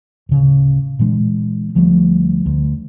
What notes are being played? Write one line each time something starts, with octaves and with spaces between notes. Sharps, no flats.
D1 C#3
A#2 E3 G#3 D4
D2 F3 G3 A3
D2